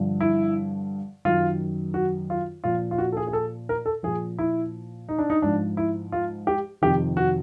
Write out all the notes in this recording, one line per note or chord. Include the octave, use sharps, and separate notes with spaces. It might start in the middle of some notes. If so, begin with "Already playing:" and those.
Already playing: G2 D3 F3
E4
F#2 D#3 F4
F#4
F4
A#2 F3 F4
F4
F#4
A4
G#4
G#4
A4
A#4
A4
A#2 F3 G#4
E4
D#4
D4
D#4
G#2 F3 D4
E4
F4
G4
F2 C3 D#3 G4
F#4